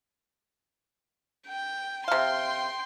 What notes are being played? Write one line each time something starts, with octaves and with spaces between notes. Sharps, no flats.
G5
C3 F5 G5 C6